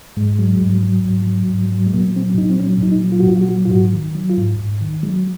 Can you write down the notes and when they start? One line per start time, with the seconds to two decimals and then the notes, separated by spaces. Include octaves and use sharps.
0.17 G#2 G#3
0.39 F#3
0.61 G#2
0.83 F#3
1.05 G#2
1.27 F#3
1.49 G#2
1.72 F#3
1.87 G#3
1.94 A#2 A#3
2.16 F#3 C4
2.38 A#2 D#4
2.50 C4
2.60 F#3 C#4
2.82 A#2 D#4
3.04 F#3
3.12 F4
3.20 F#4
3.27 A#2 F4
3.41 F#4
3.49 F#3
3.65 F4
3.71 G#2 F#4
3.93 D#3
4.15 F#3
4.29 F4
4.38 G#2
4.59 G#2
4.81 D#3
5.03 F#3 G#3